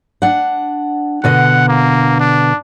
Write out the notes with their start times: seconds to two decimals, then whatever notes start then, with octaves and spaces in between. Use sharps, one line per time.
0.22 D4 F#5
1.24 B2 D3 D#5 F#5
1.68 A#3
2.20 D4